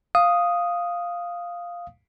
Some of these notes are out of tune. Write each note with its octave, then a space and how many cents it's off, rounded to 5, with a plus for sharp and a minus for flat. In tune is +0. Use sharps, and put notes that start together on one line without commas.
F5 +0 D#6 +0